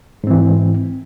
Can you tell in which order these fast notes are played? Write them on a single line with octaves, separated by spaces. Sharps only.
G#2 C4 E3